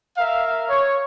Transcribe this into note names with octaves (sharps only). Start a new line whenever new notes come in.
A#4 E5 F5
C#5